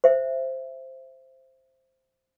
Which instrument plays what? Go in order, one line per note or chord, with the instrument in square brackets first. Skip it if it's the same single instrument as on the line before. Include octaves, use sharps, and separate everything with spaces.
[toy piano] C5 E5